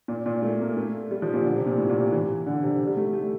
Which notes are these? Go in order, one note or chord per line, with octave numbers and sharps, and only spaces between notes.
A#2
A#2
A3
A#3
A3
G3
F3
A#2
D3
C3
A#2
A2
A#2
C3
E3
D3
C3
G3
A3
A3